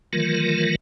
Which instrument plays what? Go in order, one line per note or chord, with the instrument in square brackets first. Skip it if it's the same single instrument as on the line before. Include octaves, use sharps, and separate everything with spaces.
[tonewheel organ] D#3 E3 F#3 A3 F4 A#4